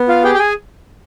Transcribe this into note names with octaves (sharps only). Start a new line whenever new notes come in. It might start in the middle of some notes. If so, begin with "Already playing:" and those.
Already playing: B3
F4 F5
G4 G#4 G5
G5
G#4 G#5